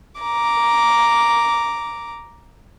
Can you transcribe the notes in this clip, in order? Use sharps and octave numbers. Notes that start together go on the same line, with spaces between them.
A#5 D6